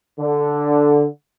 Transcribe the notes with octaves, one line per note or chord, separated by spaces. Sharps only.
D3